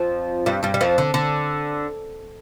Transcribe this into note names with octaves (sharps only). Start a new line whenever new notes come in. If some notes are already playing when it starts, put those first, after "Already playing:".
Already playing: F2 F3
G2 G3
G2 G3
G3
F2 F3
D3
D3